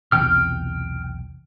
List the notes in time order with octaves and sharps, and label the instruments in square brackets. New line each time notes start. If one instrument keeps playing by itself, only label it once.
[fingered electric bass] B1 E2 C3 [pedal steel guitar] G5 F6